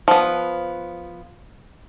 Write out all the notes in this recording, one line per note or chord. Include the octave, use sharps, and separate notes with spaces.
F3 B3